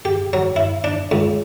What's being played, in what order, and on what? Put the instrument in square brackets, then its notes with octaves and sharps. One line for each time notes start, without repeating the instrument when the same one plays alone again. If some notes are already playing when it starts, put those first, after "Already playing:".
[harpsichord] G4
F#3
E4
D4
C#2